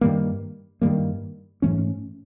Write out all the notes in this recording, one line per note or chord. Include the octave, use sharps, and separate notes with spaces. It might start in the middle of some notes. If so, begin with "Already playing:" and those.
G2 D#3 G3 A#3
G2 D#3 G3 A#3
G#2 E3 A3 C#4